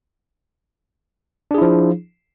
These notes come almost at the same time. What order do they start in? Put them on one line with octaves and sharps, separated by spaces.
D4 G#4 E4 F3